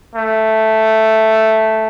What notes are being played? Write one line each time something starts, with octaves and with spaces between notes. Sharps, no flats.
A3